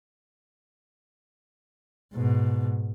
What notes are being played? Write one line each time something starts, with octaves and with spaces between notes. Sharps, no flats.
G#2 B2